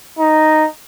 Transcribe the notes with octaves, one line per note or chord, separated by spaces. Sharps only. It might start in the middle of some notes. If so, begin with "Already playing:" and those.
D#4